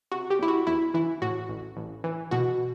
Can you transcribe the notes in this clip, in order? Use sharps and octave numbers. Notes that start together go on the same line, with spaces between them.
C3 F#4
G4
E2 E4
F#4
E2 E4
E3 E4
A2 F#4
A1
A1
E3
B2 F#4